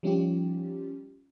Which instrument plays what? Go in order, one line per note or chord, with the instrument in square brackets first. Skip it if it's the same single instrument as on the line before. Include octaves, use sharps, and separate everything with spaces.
[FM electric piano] F3 G3 C#4 D#4 F4 G4